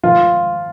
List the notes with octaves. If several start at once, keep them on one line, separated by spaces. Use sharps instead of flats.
F3 F4